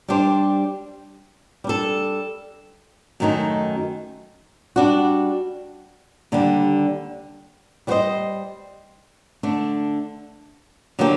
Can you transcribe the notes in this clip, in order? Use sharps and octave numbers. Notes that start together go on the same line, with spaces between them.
G3 D4 G4 C5
G3 D4 A4
F#2 D#3 A3 D#4
G3 D4 F#4
D#2 D3 G3
G3 C4 F#4 C5 D#5
D3 A3 D4
D3 F#3 A#3 D4 G4